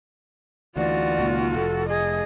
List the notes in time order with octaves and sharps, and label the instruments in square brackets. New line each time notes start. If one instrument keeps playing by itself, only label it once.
[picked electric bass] D2 E3 [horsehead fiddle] F4 F#4 [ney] D5
[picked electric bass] C#2 A#2 D#3
[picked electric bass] F1 [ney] A4
[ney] G#4 [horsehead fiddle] D#5